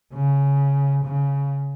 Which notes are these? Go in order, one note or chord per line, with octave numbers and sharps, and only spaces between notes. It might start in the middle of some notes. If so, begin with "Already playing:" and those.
C#3
C#3